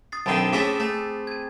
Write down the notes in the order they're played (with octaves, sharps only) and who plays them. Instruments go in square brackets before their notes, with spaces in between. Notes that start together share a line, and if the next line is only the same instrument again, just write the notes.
[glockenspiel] D#6 A6 C7
[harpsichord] B1 D3 D#3 [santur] C4 [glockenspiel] A5 B5 C7
[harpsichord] A2 C#4 E4 [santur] G#4 E6 [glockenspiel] D6 B6
[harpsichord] A3
[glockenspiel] G#6 D#7